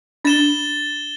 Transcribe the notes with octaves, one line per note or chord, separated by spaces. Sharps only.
D4 A6 E7 G7